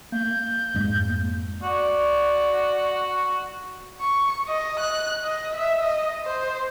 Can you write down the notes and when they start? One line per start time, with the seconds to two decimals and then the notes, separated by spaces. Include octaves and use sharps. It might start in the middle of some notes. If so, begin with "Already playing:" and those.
0.12 A#3 G6
0.74 F2 G#2 G#3
1.63 F#4 D5
4.01 C#6
4.48 D#5
4.80 F#6
5.24 D#5
5.55 E5
5.84 D#5
6.25 C5